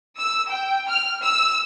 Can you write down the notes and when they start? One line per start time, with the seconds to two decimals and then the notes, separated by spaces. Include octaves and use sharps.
0.19 E6
0.50 G5
0.88 F6
1.22 E6